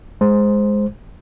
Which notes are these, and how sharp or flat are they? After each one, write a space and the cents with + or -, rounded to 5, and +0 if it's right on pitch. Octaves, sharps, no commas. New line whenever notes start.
G#3 +0 C5 +0